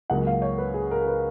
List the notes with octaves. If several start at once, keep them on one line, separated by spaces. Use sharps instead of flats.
C#2 C#3 F#3 A#3 F#5
F5
C#5
B4
G#4
A#4
B4